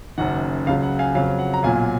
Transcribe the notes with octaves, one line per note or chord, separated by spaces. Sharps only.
F#1 F#2 D#3 F#5
C#2 C#3 F#3 F5
F#5
F5 G#5
F2 C#3 F#3 F5
F#5
A#5
B1 A#2 F#3 F5 G#5